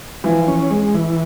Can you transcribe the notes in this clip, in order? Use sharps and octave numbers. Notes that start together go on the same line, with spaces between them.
E3 F3
C#4
G#3
E3